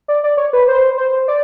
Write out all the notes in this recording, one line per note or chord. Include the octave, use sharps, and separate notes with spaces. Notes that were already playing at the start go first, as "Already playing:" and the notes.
D5
D5
C#5
B4
C5
C5
D5